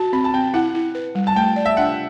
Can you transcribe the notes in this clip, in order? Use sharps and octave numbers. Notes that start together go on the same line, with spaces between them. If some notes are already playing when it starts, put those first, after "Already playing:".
Already playing: F#4 A5
C4 B5
A5
C4 G5
E4 F#5
E4
B4
G3
A5
A3 G5
D5
E5
D4 F#5